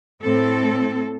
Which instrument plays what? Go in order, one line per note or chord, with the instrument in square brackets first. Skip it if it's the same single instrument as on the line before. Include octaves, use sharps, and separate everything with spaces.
[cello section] A2 C4 A4